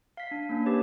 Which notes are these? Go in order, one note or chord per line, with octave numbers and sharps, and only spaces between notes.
F5 B6
D4
A#3 C#4
G4 B4 C#5